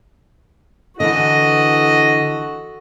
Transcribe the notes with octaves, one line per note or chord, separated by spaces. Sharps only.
D3 E3 F#4 A4 D#5